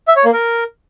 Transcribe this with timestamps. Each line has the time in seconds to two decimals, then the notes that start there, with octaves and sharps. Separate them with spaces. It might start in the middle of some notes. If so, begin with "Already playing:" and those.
0.08 E5
0.16 C#5
0.25 A#3
0.33 A#4